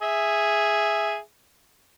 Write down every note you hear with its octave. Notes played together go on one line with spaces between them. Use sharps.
G#4 E5